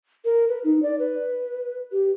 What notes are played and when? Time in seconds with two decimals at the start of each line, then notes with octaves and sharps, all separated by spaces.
0.25 A#4
0.49 B4
0.64 D#4
0.82 D5
0.99 B4
1.92 G4